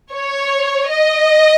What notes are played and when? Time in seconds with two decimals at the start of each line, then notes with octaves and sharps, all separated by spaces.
0.13 C#5
0.90 D#5